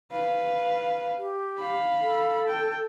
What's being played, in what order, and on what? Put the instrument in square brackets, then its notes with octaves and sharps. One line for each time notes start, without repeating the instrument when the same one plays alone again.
[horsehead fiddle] B4 F5
[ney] G4
[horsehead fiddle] F5 B5
[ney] A4
[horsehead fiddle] G5